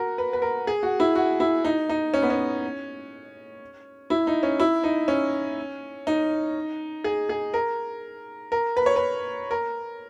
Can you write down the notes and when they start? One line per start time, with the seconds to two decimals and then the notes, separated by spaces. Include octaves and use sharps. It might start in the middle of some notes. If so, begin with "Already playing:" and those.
Already playing: F#4 A#4
0.18 B4
0.33 B4
0.42 A#4
0.67 G#4
0.83 F#4
1.00 E4
1.15 F#4
1.40 E4
1.65 D#4
1.90 D#4
2.14 C#4
2.22 B3
2.30 C#4
4.10 E4
4.27 D#4
4.43 C#4
4.60 E4
4.84 D#4
5.08 C#4
6.07 D#4
7.04 G#4
7.29 G#4
7.54 A#4
8.52 A#4
8.77 B4
8.86 C#5
8.96 B4
9.51 A#4